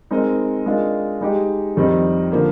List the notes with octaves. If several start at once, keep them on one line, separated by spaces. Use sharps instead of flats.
G#3 C4 D#4 A#4 D#5
G#3 D4 F4 A#4 D#5
G#3 D#4 G4
F2 D#3 G3 C4 D#4
D3 F3 A#3